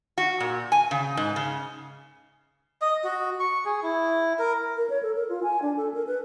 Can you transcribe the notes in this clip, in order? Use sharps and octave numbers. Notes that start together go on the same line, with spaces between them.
F#4
A#2
G#5
C#3
G#2
C#3
D#5
F#4
C#6
G#4
E4
A#4
A#4
C#5
A4
A#4
F4
G#5
D4
A4
A#4
B4